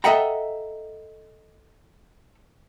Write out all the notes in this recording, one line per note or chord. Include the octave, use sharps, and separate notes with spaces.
A4 D#5 E5 F#5 G5 A#5